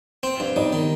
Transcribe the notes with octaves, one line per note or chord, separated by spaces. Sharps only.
C4
G2
G3 D#4 D#5
D#3